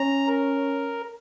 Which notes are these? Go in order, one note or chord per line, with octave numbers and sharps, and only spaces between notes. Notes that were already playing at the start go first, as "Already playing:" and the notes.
Already playing: C#4 A#5
A#4